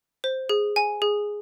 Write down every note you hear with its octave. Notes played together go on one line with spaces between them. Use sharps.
C5
G#4
G#5
G#4